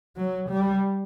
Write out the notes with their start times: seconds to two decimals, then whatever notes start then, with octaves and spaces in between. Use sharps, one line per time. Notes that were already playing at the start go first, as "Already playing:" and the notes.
0.16 F#3
0.49 G3